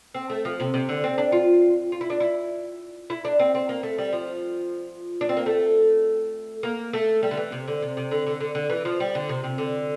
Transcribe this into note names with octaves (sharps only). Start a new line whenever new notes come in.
C4
A3
F3
C3
C3
D3
C4
D4
F4
F4
E4
D4
E4
E4
D4
C4
C4
A#3
A3
G3
F3
D4
C4
A#3
A3
A#3
A3
G3
D3
E3
C3
D3
C3
C3
D3
D3
D3
D3
E3
F3
G3
D3
C3
C3
D3